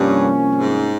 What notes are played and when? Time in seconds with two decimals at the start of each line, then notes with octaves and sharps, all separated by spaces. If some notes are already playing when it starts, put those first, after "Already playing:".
Already playing: C2 G2 C3 F3 A#3 C#4
0.54 G#2